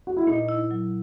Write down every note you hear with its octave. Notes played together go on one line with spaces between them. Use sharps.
F#4
E4
A#2 D#4
E4
F#3